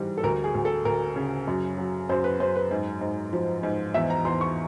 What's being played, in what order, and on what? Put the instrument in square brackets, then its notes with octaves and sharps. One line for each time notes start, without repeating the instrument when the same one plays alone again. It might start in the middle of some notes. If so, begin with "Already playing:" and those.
Already playing: [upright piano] G#2 E3 G3
A4
D2 A#4
G#4
D2
A4
D2 A#4
C#3
F#2
F#3
F#2 C5
B4
F#2 C5
B4
G#2
G#2
F3
G#2
E2 E5
A#5
E2 C6
C#6